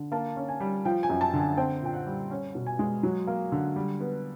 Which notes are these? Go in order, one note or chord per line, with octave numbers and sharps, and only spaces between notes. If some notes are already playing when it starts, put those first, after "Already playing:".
Already playing: D3
A#3 A5
C#4
G#5
G3
F3 G5
G#5
F#2
A5
D3
G#5
C4 G5
A#2 G5
F#5
G3
C#4
B2
G#5
G#3
F#3
A#3
D3
G3
B3